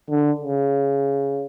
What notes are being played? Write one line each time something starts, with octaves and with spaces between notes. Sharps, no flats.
D3
C#3